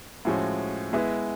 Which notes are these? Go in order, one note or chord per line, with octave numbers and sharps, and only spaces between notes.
A2 F3 G#3 C#4 F#4
G#3 B3 E4